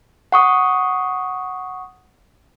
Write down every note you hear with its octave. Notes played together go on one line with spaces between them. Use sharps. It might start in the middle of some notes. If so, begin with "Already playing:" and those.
F#5 C#6 D#6